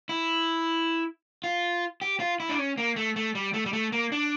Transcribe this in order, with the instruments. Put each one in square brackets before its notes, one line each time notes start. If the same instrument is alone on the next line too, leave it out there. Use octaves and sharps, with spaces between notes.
[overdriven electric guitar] E4
F4
G4
F4
E4
D4
C#4
A#3
A3
A3
G3
A3
G3
A3
A#3
D4